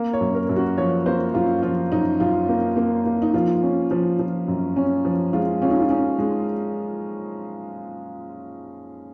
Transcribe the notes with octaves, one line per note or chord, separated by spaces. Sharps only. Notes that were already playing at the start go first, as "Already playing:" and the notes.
Already playing: A#3
C#5
F#2
A#4
F#2
F#4
F3 C#5
A#3 C5
F#2 F4
F3 F4
F#2 D#4
F#2 F4
A#3
A#3
A#3
D#4
F3 F4
C#4
F3
F3
F#2
C#4
F3
G#3 F4
C#4 F4
D#4
F4
C#4 D#4
G#3